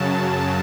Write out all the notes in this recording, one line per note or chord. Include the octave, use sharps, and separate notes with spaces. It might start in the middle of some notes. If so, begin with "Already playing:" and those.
Already playing: F#2 C#3 F#3 A5